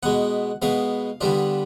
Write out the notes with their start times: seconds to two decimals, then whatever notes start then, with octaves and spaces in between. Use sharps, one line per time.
0.03 B2 G#3 B3 F#5
0.62 B2 G#3 B3 F5
1.21 D3 G3 B3 D4 F4